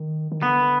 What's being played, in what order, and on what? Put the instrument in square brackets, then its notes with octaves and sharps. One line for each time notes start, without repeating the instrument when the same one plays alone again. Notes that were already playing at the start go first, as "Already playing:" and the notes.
Already playing: [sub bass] D#3
D#3
[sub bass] D3 [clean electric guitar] B3